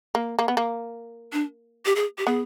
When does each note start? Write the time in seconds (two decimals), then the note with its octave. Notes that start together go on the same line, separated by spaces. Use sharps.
0.15 A#3
0.39 A#3
0.48 B3
0.57 A#3
1.33 D4
1.86 G4
1.96 G#4
2.18 G4
2.26 B3 G#4